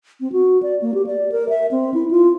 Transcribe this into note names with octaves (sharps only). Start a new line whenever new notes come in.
C4
F#4
D5
A#3
G4
D5
A#4
E5
C4
E4
F4